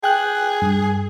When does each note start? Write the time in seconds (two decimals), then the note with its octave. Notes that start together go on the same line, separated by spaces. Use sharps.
0.03 G#4 G5 F#6
0.62 G2